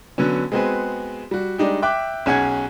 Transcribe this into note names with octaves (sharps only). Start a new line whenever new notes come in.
D3 F#3 B3 C#4
G#3 B3 C4 F#4 G#4 B4
G3 F#4
G3 G#3 D4 D#4 G4
E5 G5 D6 F#6
B1 C#4 G#4 F#5 G#6